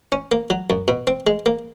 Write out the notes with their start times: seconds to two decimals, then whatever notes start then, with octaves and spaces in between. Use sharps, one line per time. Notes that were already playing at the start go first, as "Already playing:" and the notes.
0.12 C#4
0.32 A#3
0.50 F#3
0.70 F#2
0.88 B2
1.07 C4
1.27 G#3
1.46 A#3